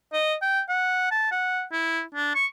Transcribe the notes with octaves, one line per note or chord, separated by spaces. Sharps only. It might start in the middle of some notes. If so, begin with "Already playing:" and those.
D#5
G5
F#5
A5
F#5
E4
D4
C#6